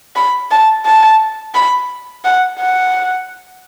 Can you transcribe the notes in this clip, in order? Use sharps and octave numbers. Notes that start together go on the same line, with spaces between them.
B5
A5
A5
B5
F#5
F#5